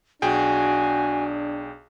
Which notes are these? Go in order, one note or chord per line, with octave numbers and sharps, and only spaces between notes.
B1 D4 F#4 G#4 G5 G#5